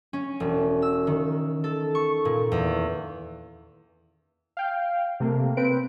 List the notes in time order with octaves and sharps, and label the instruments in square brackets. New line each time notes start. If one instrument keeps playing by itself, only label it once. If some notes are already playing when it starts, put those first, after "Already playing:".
[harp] C#4
E1
E6
D#3
A4
C#6
A#2
E2
[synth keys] F5 G5
C3 A3 A#3
C4 B4 D7